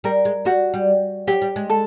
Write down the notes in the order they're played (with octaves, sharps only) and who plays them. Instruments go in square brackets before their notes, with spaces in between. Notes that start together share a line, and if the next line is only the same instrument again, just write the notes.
[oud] G3 [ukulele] A#4
[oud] G#3
[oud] G3 [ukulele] F#4
[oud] G3
[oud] F#3 [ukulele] G4
[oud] G3
G#3
[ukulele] A4